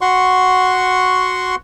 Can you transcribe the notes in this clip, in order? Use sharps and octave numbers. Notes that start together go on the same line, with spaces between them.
F#4 F#5 C6 C#6